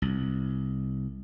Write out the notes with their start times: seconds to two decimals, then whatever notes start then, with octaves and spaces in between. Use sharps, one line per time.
0.02 C2